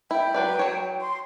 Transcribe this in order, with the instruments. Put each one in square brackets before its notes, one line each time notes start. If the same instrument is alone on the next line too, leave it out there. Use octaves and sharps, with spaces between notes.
[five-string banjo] E4 [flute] G5
[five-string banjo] F#3 B4 D5
F#3 C#5
[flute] C6